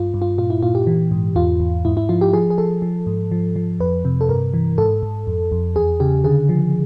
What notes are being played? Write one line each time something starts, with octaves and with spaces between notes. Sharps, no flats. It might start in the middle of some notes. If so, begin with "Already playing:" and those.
Already playing: G2 F4
G2
F4
A#2 F4
E4
A#2 F4
G4
E3
G#2
E2 F4
E2
G#2 E4
E4
F3 F4
G4
F3 G#4
G#4
F3 A4
F3
G#2
F3
F3
F2 B4
C3
A4
G2 A#4
E3
G#2 A4
G#2
F2
F2
E2 G#4
C#3 G4
D3 G#4
F3